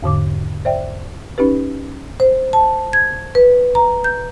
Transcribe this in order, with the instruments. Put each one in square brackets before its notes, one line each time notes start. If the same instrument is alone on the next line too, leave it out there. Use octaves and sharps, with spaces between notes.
[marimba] E2 G#2 D3 D6
C5 D5 E5 G5
C#4 D#4 G4 B4
C5
A5
G#6
B4
A#5
G6